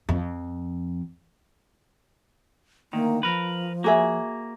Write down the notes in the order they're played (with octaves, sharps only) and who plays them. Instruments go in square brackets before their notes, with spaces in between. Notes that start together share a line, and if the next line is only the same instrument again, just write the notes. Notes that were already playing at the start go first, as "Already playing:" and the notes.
[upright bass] F2
[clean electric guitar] D2 D#3 [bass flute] A#3
[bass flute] F3 [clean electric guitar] A#4 B4
[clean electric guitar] A#3 [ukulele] F#4 G#4 E5